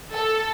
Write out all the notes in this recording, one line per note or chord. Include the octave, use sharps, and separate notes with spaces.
A4